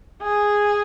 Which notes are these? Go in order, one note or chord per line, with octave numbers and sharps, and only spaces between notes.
G#4